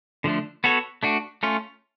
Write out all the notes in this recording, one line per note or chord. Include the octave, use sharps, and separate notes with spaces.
D3 F3 A3 D4
B3 F#4 A4 C#5
A3 D4 F#4
A3 C#4 F4